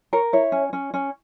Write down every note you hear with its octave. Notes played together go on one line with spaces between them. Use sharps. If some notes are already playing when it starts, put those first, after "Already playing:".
A#4 C#5
E4 C#5
C#4
C#4
C#4